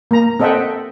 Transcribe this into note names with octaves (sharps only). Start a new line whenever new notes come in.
A#3 A#5
C4 A4 D#5 E5 F#5 G5